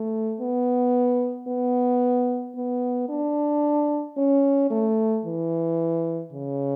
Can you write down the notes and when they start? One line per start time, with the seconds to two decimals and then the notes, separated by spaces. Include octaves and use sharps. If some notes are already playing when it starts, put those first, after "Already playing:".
Already playing: A3
0.40 B3
1.48 B3
2.56 B3
3.09 D4
4.17 C#4
4.70 A3
5.25 E3
6.33 C#3